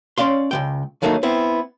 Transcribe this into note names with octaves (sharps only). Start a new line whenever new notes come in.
C#4 D5 F5 C6
C#2 E3 G5
D#3 F#3 A3 A#3 D4 D#4
B3 C4 E4